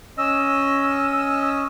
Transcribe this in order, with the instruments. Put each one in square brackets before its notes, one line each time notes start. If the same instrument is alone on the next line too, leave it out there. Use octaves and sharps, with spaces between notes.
[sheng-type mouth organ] C#4 D#5 [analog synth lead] E6